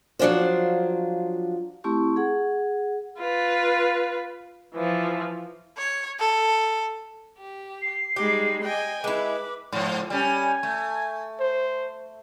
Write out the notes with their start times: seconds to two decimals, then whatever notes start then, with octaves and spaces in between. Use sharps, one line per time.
0.19 F3 F#3 D4 F4 C5
1.84 A3 C4 E4 G4 C#6
2.16 G#4 F#5
3.19 F4 B4
4.74 E3 F3
5.77 C#5
6.19 A4
7.39 G4
7.82 C7
8.16 G3 G#3 D#4 G4
8.63 D#5 G5 G#5
9.04 G#3 E4 B4 D6
9.72 G#2 F3
10.10 G3 C#4 G#5
10.63 A3
11.40 C5